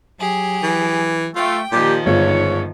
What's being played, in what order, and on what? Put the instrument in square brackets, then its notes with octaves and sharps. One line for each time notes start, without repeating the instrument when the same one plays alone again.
[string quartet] F#3 G4 G#4
[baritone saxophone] E3
[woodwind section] A3 [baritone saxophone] F4 [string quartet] G5
[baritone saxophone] A#2 [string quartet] D#3 F3 [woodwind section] G4
[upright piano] G1 F4 [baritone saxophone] G#2 [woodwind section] C#5